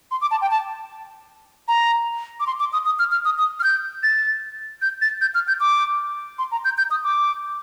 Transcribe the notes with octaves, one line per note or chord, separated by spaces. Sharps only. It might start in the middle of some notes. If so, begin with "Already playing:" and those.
C6
D6
A5
G5
A5
A#5
D6
C6
D6
D#6
D#6
F6
F6
D#6
D#6
F6
G6
A6
G6
A6
G6
F6
G6
D6
C6
A#5
G6
G6
D#6
D6